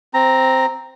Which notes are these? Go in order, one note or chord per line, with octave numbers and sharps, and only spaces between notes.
C4 A#5